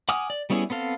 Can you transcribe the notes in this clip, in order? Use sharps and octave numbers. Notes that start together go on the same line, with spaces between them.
F#5 G#5 D6 D#6 F6
D5
G3 B3 C#4 E4 G#4
B3 C4 A4 F5